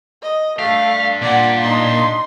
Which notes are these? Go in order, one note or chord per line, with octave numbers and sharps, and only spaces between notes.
D#5
A3 D4 G4 F5
A#2 D5 F#5
D#4 C6